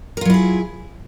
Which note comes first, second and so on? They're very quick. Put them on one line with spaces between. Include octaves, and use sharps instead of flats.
A#4 F4 F#3 E4 G#4